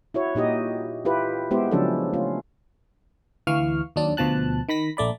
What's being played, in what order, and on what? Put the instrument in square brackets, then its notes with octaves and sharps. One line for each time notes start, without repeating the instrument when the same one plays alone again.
[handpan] E4 F#4 C#5
A#2 D#4 G4 D#5
E4 F4 G4 B4
G#3 B3 E4 G4 C5
C#3 F3 F#3 C#4 D4 A4
A3 C#4 F4
[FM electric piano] D2 E3 F5 C#6 F6
D#2 F#3 D4 D5
D2 B2 F3 A5 F#6
D#3 B5 A#6 B6
A#1 A3 D5 B5